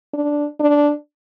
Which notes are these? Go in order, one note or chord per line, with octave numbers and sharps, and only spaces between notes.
D4
D4